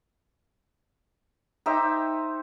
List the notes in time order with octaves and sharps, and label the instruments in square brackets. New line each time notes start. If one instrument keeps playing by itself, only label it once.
[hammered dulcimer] D#4 G4 C5 E5